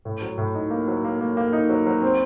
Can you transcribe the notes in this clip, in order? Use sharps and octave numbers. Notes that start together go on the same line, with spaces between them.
A2
F#3
A2
D#4
A#3
F#3
A#3
A#3
A#3
D#4
F#3
F#3
C4